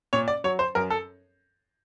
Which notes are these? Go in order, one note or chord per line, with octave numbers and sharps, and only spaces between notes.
A#2 C#5
D5
F#3 C#5
C5
F#2 A#4
A4